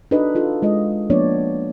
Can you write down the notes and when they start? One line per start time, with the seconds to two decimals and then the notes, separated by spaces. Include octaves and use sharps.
0.11 D4 D#4 F#4 A4 B4 D#5
0.35 D#4 F4 A4
0.62 G#3 F4 D#5
1.10 F3 A#3 B3 D4 C#5 D5